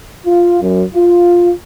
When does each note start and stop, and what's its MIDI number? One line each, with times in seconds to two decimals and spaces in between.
0.25 0.59 65
0.61 0.83 42
0.94 1.51 65